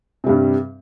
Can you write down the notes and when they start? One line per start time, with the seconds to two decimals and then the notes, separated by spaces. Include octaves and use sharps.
0.24 C3
0.26 G3
0.29 G2